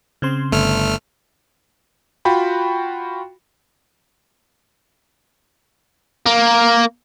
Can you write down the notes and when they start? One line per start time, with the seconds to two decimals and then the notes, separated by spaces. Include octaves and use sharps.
0.22 C#3 C4 C6
0.52 G1 A3 F6
2.25 F4 F#4 G5 B5
6.26 A#3